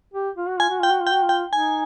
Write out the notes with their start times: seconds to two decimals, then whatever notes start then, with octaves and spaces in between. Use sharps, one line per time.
0.14 G4
0.37 F4
0.48 F#4
0.59 F4 G#5
0.69 F#4
0.80 F4 G5
0.90 F#4
1.01 F4
1.07 G5
1.12 F#4
1.23 F4
1.29 G5
1.53 D#4 G#5